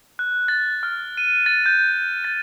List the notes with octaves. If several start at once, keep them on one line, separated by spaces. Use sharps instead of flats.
F#6
A6
F6
D#7
A6
G6
A6